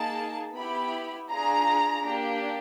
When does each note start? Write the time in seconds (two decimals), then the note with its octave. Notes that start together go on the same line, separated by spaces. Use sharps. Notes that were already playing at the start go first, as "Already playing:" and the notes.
Already playing: A#3 D#4 G#4 A5
0.54 B3 E4 G4 B5
1.30 D4 F4 G#4 A#5
2.05 A#3 D4 G4